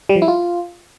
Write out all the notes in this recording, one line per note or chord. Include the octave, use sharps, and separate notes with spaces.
G3
F3
E4
F4